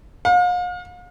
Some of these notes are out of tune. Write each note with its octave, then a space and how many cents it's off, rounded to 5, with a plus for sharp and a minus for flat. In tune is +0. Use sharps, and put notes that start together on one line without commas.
F5 +40